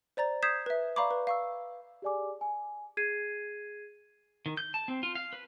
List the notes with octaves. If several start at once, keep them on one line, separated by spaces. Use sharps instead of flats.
C5 D5 A#5 A6
D#6 G6 G#6 B6 C7 E7
B4 E5
D5 F5 A#5 B5 C#6 D6
B4
F5 C#6 E6
G4 G#4 D5 G#5 D6
G#5
G#4 G#6 C7 D#7
D#3
G6
A5
C4
F4
F5
B4